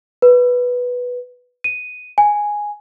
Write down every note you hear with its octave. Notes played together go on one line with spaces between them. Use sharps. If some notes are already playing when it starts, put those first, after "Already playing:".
B4
D#7
G#5